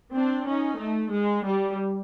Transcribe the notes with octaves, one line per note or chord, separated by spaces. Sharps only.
C4 D4
C#4 D#4
A3
G#3
G3